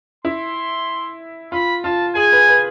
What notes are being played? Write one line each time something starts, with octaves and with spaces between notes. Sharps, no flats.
E4 C6
F4 B5
F4 A5
G#4 G#5
B4
B4